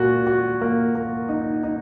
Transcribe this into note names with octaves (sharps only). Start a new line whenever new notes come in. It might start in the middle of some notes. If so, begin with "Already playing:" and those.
Already playing: A#2 A#3 F#4
F#4
A#3
A#3
D#4
D#4